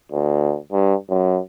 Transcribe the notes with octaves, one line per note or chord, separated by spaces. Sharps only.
D2
G2
F#2